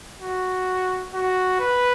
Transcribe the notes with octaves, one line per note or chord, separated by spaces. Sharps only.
F#4
F#4
B4